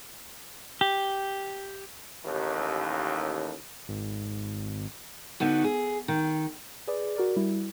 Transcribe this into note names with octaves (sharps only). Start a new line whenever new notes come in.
G4
A1 D#2
G#1
D3 B3 D#4 F#4
G#4
D#3
G#4 B4 D5
F#4 A#4 D5
G3 E4